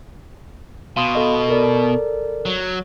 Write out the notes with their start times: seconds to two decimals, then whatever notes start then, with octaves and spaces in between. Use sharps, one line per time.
0.97 B2 F5 C6 D#6
1.15 A4 D#5
1.48 A4 A#4 D5
2.46 F#3